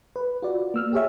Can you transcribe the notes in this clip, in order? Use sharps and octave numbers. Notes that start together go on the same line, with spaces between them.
B4
F4 F#4 D5
A#3 E6 F6
G4 G#4 C#5 E5